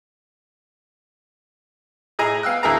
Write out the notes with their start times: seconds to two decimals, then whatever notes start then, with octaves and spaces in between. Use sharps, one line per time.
2.19 A2 G#4 D#5 G#5 A#5
2.43 B3 F5 G5 E6 F#6
2.63 D2 E4 G#4 A#4 A5 A#5